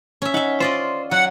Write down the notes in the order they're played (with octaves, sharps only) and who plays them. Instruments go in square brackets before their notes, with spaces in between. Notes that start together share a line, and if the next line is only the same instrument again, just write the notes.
[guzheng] C#4 E5
[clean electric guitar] D#4 [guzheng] E5 F#5
[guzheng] F4 D5 D#5 [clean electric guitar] C5
[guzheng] F#3 [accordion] F#5